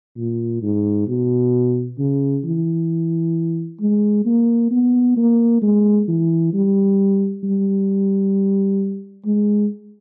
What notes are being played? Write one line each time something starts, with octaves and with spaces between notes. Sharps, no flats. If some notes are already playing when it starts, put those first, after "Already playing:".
A#2
G#2
B2
C#3
E3
G#3
A#3
B3
A#3
G#3
E3
G3
G3
G#3